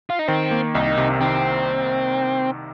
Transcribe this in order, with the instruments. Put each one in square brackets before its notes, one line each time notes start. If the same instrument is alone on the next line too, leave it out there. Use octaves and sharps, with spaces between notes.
[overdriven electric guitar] F4
D#4
[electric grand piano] D#3 [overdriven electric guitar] C4
[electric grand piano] A#3
[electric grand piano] C2 [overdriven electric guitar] D#4
[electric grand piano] C3
[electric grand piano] D#3 [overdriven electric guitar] C4